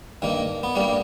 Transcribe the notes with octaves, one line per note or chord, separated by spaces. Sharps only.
G2 D#3 A#3
B3
G2 G3 A#3